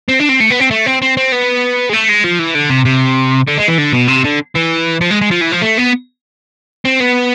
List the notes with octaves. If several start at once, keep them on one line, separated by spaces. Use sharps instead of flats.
C4
D4
C4
A3
B3
C4
A3
C4
C4
C4
B3
G#3
A3
G#3
F3
E3
D3
C3
C3
D3
G#3
E3
D3
B2
C3
D3
E3
F3
G#3
G#3
F3
E3
F3
A3
B3
C4
B3